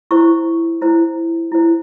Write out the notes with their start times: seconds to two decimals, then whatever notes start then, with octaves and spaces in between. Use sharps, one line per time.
0.11 E4 C5 C#6
0.81 E4 C5
1.52 E4 C5